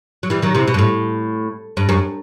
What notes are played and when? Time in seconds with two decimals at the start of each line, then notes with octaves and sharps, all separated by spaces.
0.23 F#3
0.30 E3 G3
0.42 D#3 F#3
0.54 C3 E3
0.68 B2
0.74 G2
0.79 A2
1.77 G2
1.89 F#2